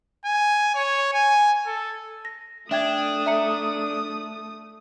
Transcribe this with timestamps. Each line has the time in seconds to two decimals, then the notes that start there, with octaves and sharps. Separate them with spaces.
0.25 G#5
0.75 C#5
1.13 G#5
1.66 A4
2.25 A#6
2.71 A3 D4 E5 G5 D#6 G#6
3.26 E5 A#5 C#7